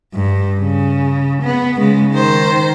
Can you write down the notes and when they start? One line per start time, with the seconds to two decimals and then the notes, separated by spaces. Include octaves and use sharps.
0.14 G2
0.60 C#3
1.43 B3
1.79 C#3 G#3
2.13 D#3 C5